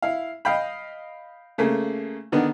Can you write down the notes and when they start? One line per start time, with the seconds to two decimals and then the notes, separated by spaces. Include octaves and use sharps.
0.02 E4 F5
0.45 D#5 F5 G5 B5
1.58 C#3 A3 A#3
2.32 D3 D#3 B3 D4